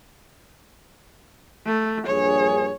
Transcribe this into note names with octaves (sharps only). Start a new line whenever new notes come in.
A3
A#1 G2 G#4 C#5